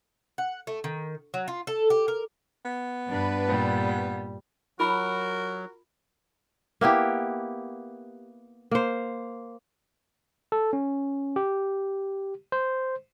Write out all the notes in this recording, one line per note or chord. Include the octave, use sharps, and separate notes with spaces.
F#5
A3
D#3
F#3
F4
A4
G4
A#4
B3
G2 D4 B4
A#2 G3
F#3 F4 F#4 A#4 B5
A#3 B3 E4 G4
A#3 C5
A4
C#4
G4
C5